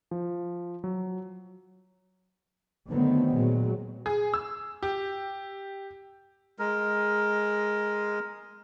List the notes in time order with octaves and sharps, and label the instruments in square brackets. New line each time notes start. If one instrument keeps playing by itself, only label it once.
[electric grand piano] F3
F#3
[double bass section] D3 D#3 F#3 A3 B3 C4
A#2 F#3 G#3
[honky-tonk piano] G#4
E6
G4
[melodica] G#3 A#4